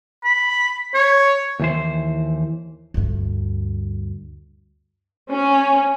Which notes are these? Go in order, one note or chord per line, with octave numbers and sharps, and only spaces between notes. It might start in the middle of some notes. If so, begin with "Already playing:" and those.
B5
C#5
D#2 E3 C5
D2 G2
C#4